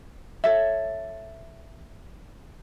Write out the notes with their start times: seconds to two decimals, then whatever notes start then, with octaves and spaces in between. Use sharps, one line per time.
0.44 A4 C#5 E5